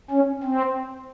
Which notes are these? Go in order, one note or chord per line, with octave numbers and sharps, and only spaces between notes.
C#4
C4